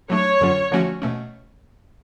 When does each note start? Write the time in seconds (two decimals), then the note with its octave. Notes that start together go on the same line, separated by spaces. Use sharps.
0.10 F#3 A3 D4 C#5
0.41 F#2 D3 F#3 C#4 F4
0.72 D3 F3 A3 C#4 F#4
1.02 B2 A3 C#4